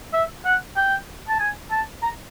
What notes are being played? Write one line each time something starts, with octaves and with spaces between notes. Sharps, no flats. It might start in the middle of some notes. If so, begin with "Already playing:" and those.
E5
F#5
G5
A5
G#5
A5
A#5